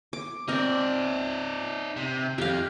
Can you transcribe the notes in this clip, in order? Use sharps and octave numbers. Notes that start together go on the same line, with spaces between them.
D6
C4 D#4 A#4 D5
C3
F2 G4 F5